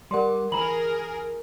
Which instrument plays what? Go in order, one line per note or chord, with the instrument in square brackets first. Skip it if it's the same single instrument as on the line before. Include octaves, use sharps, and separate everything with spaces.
[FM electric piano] G3 D5 F#5 [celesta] A#4 C6
[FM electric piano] E3 [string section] G#4 A#4 [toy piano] A#5 B5 [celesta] F#7